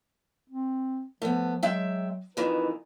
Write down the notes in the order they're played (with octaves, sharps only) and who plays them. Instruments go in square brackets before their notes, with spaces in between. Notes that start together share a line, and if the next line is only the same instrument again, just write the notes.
[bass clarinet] C4
[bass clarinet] F3 [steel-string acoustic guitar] A3 B3
[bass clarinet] F#3 [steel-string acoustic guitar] G#3 E5 G5
[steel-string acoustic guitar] F2 D#3 E3 [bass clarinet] B4